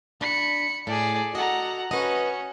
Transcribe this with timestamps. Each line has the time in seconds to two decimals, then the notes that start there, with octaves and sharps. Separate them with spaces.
0.21 D4 B5 C#7
0.87 A2 G#4 D5 A5
1.35 F#4 A4 D#5 F#5 A#5
1.91 C#4 F#4 B4 D#5 C#7